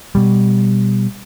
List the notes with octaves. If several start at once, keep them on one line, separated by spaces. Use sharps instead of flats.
B2 G3